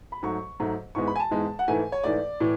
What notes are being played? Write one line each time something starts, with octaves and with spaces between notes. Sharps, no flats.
B5
G#2 F#3 A3 C#6
G#2 F#3 A3
G#2 E3 G#3 B3 C#6
B5
G#5
A5
G#2 E3 G#3 B3
F#5
G#2 E3 A3 G#5
C#5
G#2 E3 A3 D5
A2 E3